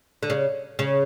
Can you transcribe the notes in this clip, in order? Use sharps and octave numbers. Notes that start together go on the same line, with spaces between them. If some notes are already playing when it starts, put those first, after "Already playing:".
D3
C#3
C#3